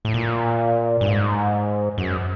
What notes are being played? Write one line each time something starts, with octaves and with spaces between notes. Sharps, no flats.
A2
A#2
G2
G#2
F#2